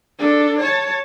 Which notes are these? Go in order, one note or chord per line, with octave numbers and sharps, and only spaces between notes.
D4 A4
C#5 A5